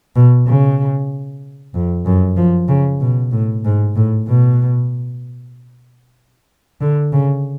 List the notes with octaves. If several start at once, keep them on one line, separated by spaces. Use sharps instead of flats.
B2
C#3
F2
F#2
F3
C#3
B2
A2
G#2
A2
B2
D3
C#3